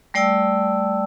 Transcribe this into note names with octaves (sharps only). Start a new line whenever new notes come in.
G3 A3 D5 G5 A5 E6